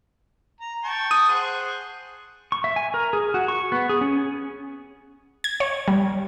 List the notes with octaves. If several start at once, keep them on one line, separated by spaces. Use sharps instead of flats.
A#5
G5 A5 C#6
D#6
G#4 C5 F#5
C#6
E5
G#5
A#4
G#4
F#4
C#6
B3
G#4
C#4
G#6
C#5
G3